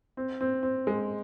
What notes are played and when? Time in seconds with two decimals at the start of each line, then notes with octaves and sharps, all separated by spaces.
0.17 C4
0.41 C4
0.63 C4
0.87 G#3